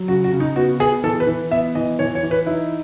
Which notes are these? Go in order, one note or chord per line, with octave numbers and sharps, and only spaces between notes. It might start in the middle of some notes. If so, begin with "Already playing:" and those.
Already playing: F#3
C#3 F#4
F#4
C#3
D#4
B3 F#4
B3 G#4
E3 A4
B4
E3
B3 E5
E3 D#5
E3 C#5
C#5
E3
B4
D#4 E4